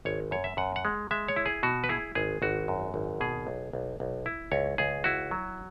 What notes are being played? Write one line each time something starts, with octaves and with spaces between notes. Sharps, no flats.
G#1 C#5
F#2 C#5
E5
F#2 F#5
F#5
G#3
G#3 E5
C#5
E4
G#4
B2 F#4
B4
E4 G#4
G#1 G#4
G#1 F#4
F#2
G#1
B2 G#4
B1
B1
B1
E4
C#2 C#5
C#2 G#4
E4 F#4
F#3